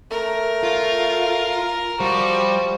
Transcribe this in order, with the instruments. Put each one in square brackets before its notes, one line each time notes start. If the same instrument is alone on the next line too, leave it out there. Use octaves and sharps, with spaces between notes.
[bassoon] A3 [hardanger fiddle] A#4
[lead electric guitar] F4
[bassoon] F3 [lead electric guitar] G3 [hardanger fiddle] F#4